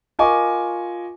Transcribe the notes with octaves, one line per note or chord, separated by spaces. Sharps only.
F4 A#4 D#5 G#5 C#6 D6